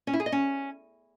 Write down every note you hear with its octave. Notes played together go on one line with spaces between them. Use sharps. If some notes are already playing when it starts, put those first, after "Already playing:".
C#4
E4
G#4
D#5
C#4